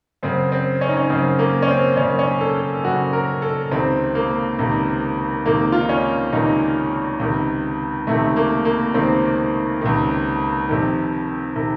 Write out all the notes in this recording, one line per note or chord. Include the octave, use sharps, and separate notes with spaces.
F#2 C#3 C4
C4
C#4
D#4
C#4
F#2 C#3 C4
A#3
C#4
C4
F#2 C#3 C#4
C#4
A4
F#2 C#3 F#4
A#4
A4
C#2 C3 D#3 C4
A#3
C#2 C3 D#3
C#2 C3 D#3 A#3
F4
D#4
C#4
C#2 C3 D#3 D#4
C#2 C3 D#3
C#2 C3 D#3 A3
A#3
A#3
C#2 C3 D#3 C4
C#2 C3 D#3
F2 C3 D#3
C3 D#3